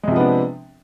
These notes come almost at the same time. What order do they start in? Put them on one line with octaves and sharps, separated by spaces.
G#3 C3 F3 B3 D4